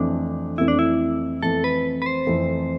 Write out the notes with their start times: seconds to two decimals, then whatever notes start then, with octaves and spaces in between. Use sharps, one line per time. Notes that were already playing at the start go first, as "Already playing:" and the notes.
Already playing: F2 E3 A3 C4 D4
0.58 F2 E3 A3 C4 E4
0.68 D4
0.79 E4
1.43 F2 E3 A3 C4 A4
1.64 B4
2.02 B4
2.06 C5
2.27 F2 E3 A3 C4